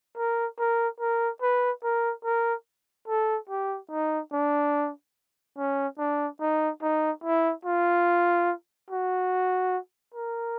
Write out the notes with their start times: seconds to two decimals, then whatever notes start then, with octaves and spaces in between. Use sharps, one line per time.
0.17 A#4
0.59 A#4
1.00 A#4
1.42 B4
1.84 A#4
2.25 A#4
3.08 A4
3.49 G4
3.91 D#4
4.33 D4
5.58 C#4
5.99 D4
6.41 D#4
6.82 D#4
7.24 E4
7.65 F4
8.90 F#4
10.14 A#4